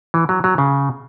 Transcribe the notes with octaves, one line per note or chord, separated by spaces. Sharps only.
E3
F#3
F#3
C#3